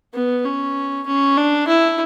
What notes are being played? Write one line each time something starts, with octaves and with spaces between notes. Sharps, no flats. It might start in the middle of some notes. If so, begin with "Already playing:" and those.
B3
C#4
C#4
D4
E4